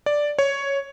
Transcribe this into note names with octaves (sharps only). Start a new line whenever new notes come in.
D5
C#5